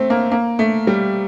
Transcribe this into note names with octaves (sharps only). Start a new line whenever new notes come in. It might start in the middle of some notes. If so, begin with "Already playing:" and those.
Already playing: A3 C4
A#3
A#3
A3
G3